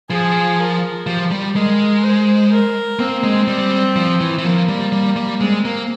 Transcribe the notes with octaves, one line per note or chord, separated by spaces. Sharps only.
F3 G#4
A#4
F3 G4
G3
G#3 A#4
C5
A#4
A#3 C4
G#3
G3
F3
E3
E3
F3 A#3
G3
G3
G3
G#3 C4
A#3